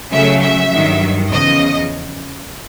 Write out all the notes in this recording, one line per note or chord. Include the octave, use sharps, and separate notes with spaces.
C#3 F#3 A3 C#4 E5
E5
G2 D#3 F#3
E2 C#3 F3 D#5